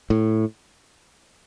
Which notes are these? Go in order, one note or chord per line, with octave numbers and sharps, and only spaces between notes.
A2